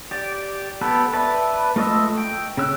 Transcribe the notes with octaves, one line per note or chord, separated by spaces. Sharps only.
G4 D5
B3 G4 A4 B4
B4 D5 E5 A5
A3 F4 D#5 C#6 E6
G5
C#3 E6 F#6